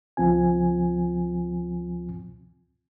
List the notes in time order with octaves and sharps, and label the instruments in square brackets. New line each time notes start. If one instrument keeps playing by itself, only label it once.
[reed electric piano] C#2 F3 C4 F4 G#5